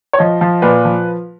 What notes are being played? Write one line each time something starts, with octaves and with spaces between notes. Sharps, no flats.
C#5
F3 D#5
F3
A#2 B4
F3